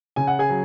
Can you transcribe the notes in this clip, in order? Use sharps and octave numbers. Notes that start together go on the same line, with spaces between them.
C#3 G#5
F#5
G#4 G#5
F#3